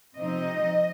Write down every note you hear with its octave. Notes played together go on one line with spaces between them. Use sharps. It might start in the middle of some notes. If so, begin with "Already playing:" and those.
C3 F3 C4 D#4 D#5